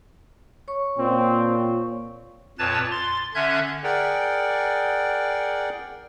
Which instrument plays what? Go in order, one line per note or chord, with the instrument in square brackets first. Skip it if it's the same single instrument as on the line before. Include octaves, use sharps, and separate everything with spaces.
[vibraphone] C#5 C#6
[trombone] A#2 [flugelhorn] C4
[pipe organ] F2 A#2 B4 C#5 A5 A6
C6 A6
D3 C#4 E5 F#6 G#6
[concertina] G#4 A#4 D5 F#5 G5